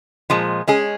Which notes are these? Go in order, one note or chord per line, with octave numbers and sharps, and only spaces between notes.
A#2 F3 G#3
G#3 C#4 G#4